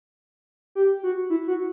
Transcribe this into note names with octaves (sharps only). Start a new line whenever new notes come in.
G4
F#4
E4
F#4